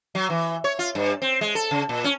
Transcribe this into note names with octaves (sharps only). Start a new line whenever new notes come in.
F#3
E3
C#5
F4
G2
C4
G#3
A4
C#3
A#2
C#4